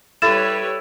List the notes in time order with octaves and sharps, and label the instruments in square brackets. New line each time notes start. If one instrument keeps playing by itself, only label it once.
[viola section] G3 B4 C#5 [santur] E4 [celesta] A4 A6 E7